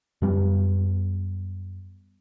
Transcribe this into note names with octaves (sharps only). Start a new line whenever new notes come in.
F#2 G3 A3 B3